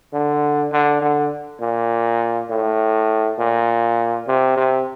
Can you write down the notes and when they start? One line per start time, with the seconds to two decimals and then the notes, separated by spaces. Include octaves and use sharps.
0.13 D3
0.72 D3
1.01 D3
1.61 A#2
2.50 A2
3.38 A#2
4.27 C3
4.57 C3